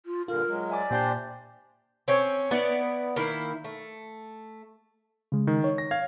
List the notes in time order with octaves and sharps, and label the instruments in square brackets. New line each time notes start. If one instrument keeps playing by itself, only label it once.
[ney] F4
[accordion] G2 A#2 D3 [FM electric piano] F4 [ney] A#4
[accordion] F#3 G#3
[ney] D5 [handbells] E5 G#5 D6
[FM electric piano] A#2 G5 G6 [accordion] D4 G4 C5
[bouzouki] C4 C#4 C#5
B3 E4 D5
D#3 A#3 E4
A3
[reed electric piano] C#3 G#3
[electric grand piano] D#3
[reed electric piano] C#5
[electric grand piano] A#6
F5 G#6